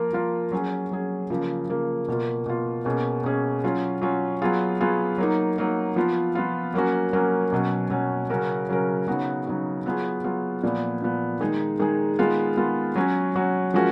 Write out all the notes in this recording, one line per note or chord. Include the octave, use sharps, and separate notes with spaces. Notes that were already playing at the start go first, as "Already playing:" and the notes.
Already playing: F3 A#3 F4 A#4
F3 A#3 F4 A#4
F#3 C#4 G#4
F#3 C#4 G#4
C#3 F3 A#3
C#3 F3 A#3
B2 A#3 F4
B2 A#3 F4
B2 A#3 C#4 G#4
B2 A#3 C#4 G#4
F#3 C#4 F4
F#3 C#4 F4
F#3 B3 F4 G#4
F#3 B3 F4 G#4
F#3 A#3 D#4
F#3 A#3 D#4
F3 B3 F4
F3 B3 F4
F#3 A#3 C#4 F#4
F#3 A#3 C#4 F#4
B2 F#3 C#4 F#4
B2 F#3 C#4 F#4
C#3 F#3 C#4 F#4 A#4
C#3 F#3 C#4 F#4 A#4
C#3 F#3 B3 D#4 F#4
C#3 F#3 B3 D#4 F#4
F#3 B3 F4 G#4
F#3 B3 F4 G#4
A#2 F3 B3
A#2 F3 B3
D#3 G#3 D#4 G#4
D#3 G#3 D#4 G#4
D#3 G#3 B3 F4
D#3 G#3 B3 F4
F#3 C#4 F#4
F#3 C#4 F#4
F3 G#3 C#4 F#4 A#4